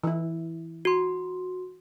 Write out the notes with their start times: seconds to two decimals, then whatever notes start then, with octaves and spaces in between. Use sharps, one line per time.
0.04 E3 E4
0.85 F#4 C6